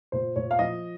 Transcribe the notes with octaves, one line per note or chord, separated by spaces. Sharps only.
A#2 C5
A#2 C#5
F5
F3 D#5